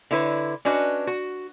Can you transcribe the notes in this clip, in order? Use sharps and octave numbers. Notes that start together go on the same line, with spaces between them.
D3 E4 B4 C#5
C#4 D4 F#4 B4 D#5
F#4